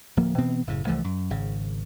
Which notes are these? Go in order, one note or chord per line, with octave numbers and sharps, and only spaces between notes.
D1 F3 A#3
B2 E3 B3 C4
F#1 A2 C#3
C2 E3 F3 A3
F#2
G#1 C#3